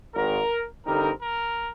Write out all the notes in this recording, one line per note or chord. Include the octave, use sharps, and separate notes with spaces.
G#1 G#2 D#3 A#4
G2 D3 G3 C4 D#4 A#4
A#4